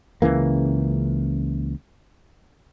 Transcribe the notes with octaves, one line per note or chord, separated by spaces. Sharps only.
C#2 C#3 E3 A#3